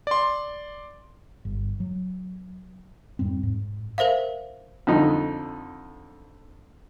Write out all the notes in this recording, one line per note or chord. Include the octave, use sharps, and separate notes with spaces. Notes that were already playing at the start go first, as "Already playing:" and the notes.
D5 C6
G1
F#3
F2 G#2 G3 C4
G#2
A#4 C5 E5 F5
F2 D3 D#4